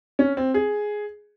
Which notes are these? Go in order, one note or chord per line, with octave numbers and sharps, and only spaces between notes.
C#4
C4
G#4